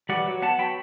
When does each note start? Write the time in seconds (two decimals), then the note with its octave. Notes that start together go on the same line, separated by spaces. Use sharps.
0.09 E3 G3 D5 F#5
0.26 F#3
0.42 B3 F#5 A5
0.59 F#3 G5 B5